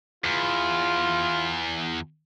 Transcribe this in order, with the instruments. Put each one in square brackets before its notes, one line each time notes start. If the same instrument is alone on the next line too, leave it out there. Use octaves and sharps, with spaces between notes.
[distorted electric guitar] E2 [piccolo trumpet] F4